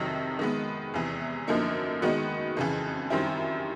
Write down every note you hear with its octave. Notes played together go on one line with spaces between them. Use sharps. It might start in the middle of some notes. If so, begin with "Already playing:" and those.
Already playing: F2 C3 D#3 F#3
D#3 G#3 B3
E2 C3 E3
F#2 D3 F3 A#3 D#4
D#3 G#3 B3 D#4 F#4
F2 C#3 E3
F#2 D#3 G3 C4 E4